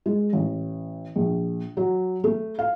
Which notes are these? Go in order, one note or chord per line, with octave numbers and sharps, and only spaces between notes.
G#3
A1
A#1
F#3
A3
F5